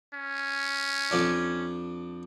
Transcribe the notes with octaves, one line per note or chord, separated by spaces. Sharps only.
C#4
F2 D4